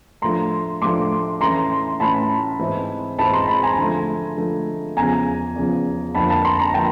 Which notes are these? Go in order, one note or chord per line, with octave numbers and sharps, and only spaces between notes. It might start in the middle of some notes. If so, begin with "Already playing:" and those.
A2 F3 A3 D4 A#5 C6
A2 F3 A3 D4 C6 D6
A2 E3 A3 C#4 E4 A#5 C6
A2 E3 A3 C#4 E4 A5 B5
G#2 E3 G#3 C4 E4
G#2 E3 G#3 C4 E4 A5 B5
A#5 C6
A5 B5
G#5 A#5
D3 F3 A3
D3 F3 A3
E2 C#3 F3 G#5 A#5
E2 C#3 F3
F2 D3 F3 A#3 A5 B5
A5 B5
A#5 C6
A#5 C6
D3 F3 A#3 G5 A5